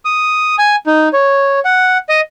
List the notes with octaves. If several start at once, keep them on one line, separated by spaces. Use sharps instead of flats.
D#6
G#5
D#4
C#5
F#5
D#5